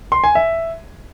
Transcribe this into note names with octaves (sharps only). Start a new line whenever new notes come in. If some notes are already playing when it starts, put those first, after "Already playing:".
C6
G#5
E5